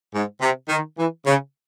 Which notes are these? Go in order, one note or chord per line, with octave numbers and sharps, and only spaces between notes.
G#2
C3
D#3
E3
C#3